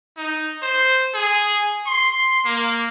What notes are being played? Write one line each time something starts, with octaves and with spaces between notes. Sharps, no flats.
D#4
C5
G#4
C6
A#3